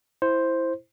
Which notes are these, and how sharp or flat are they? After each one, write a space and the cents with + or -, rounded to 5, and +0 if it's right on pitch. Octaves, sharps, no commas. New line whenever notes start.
E4 +0 C5 +0